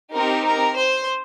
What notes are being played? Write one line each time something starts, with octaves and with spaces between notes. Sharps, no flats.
C4 D#4 G4 A#4
A#4
C5